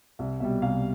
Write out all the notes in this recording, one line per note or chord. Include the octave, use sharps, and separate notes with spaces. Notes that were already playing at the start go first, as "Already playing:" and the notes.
C2 E5
B2 G3 E5
C2 F5